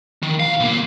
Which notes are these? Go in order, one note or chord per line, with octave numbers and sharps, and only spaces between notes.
D#3
B1 F5
B1 A#3